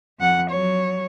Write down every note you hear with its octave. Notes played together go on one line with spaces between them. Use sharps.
F2 F#5
F#3 C#5